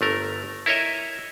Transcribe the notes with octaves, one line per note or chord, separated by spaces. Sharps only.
G1 A3 A#4
E4 A#4 C#5 D#5 E5